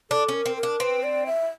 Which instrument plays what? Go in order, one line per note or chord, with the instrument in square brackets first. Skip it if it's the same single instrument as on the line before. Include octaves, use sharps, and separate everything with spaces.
[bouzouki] D4 [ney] A4
[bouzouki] C#4
[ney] A#4
[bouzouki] C4
[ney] A#4
[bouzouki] D4
[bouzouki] C4 [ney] B4
[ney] D5
E5